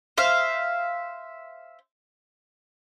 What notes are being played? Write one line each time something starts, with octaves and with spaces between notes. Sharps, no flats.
C5 E5 F5